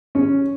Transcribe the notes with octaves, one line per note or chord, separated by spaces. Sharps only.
C#4